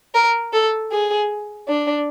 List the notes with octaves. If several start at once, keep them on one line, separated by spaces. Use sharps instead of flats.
A#4
A4
G#4
D4